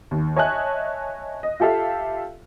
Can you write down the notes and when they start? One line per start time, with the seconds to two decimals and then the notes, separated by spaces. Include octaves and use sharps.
0.11 D#2
0.36 C#5 D#5 E5 G#5 A5 F#6
1.43 D#5
1.60 F4 G4 A4 E5 F5